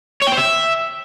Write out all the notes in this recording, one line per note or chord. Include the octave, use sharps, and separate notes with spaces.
C#5
G5
C5
E5